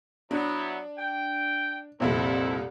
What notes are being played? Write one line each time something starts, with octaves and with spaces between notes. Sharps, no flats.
F#3 B3 D4 E4
G5
C2 F2 A#2 C4 E4 A4